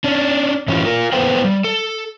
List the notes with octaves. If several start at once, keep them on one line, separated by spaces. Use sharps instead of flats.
C#4 D4
A2 E3 C#4 F4
F4 A#4
B3 A4 B4 C5 G5
G3
A4